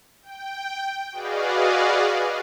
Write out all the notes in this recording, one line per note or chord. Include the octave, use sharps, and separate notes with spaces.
G5
F#4 G#4 B4 D5 D#5 F5